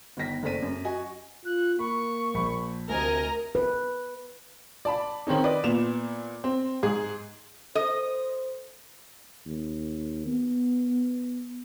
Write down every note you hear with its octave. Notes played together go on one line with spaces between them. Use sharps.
G1 D#3 D#4 A#6 B6
F#1 A3 C5 D5 B6 D#7
F#2
F#4 D#5 G#5
F4 F#6
A#3 B5 C#6
A#1 B5
D2 C3 A#4 D#5 G#5
B4
D5 A5 B5
D#3 C4 C#4 D#4
B4 D5 D#5
A#2 B3 E7 F7
C4
G#2 G#4
A4 C5 D#5
D#2
B3